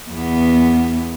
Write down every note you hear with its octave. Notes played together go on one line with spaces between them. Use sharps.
E2 B3